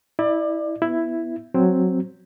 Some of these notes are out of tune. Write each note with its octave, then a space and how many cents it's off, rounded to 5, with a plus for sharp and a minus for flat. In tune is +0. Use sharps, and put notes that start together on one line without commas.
E4 -15 D5 +25
B3 +0 E4 +5
F#3 +0 C4 +0